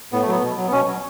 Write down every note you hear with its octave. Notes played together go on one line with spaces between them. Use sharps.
A2 B3
A3
F#3 B3
B2
F#3
B3
B2 C#4
F#3